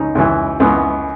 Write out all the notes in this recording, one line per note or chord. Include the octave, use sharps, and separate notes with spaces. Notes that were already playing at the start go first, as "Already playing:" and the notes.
Already playing: C#2 C#3 D#4
C#2 C#3 E3
C#2 C#3 E3 B3